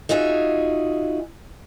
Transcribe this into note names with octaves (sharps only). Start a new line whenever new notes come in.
D#4 F4 F#4 G#4 E5